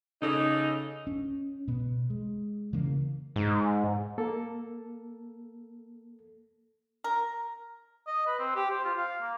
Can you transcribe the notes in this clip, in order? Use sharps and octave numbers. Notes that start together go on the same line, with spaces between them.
C#3 C#4 D#4 A4
C#4
B2 B3
G#3
C#3 E3 A#3
G#2
A#3 A4
A#4
D#5
B4
C4
G4
C5
F4
F5
A#3